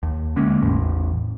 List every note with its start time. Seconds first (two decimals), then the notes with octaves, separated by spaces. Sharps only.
0.03 D#2
0.36 D3 G#3 A#3 C#4
0.62 A1 E2 A2